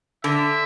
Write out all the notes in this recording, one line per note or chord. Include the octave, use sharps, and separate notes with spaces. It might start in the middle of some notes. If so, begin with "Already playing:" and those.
D3 E5